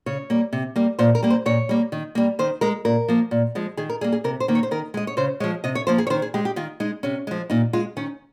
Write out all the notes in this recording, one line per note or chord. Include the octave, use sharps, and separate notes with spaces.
C#3 C#5
G3 A#3
C3
G3 A#3
A#2 C5
A#4
G3 A#3
C5
A#2 C#5
G3 A#3
D#3
G3 A#3
D#3 C5
G#3 A#4
A#2 A#4
F3 A#3
A#2
F3 G#3
D#3 G#4
A#4
G3 A#3 G#4
G#4
C3 A#4
C5
D#3 A#3
C#5
C5
D#3 A#4
G#3 D#5
C#5
C#3 C5
F3 G#3 C#5
C3 D#5
C#5
F3 A#3 C5
G#4
C#5
D#3 C5
G#4
G#3 G4
G4
D#3 F4
G#3 D#4
C3 C#4
F3 G#3
A#2 D#4
G#3 F4
D#3 C#4